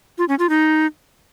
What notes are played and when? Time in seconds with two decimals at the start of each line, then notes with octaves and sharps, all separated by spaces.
0.18 F4
0.29 C#4
0.39 F4
0.49 D#4